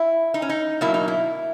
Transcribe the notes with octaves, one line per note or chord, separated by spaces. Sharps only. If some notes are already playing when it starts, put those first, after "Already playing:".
Already playing: E4
D#4
C#4
D#4
B2 F#3 A#3 E4
D#4
E4